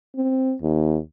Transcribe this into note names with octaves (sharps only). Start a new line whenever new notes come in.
C4
D#2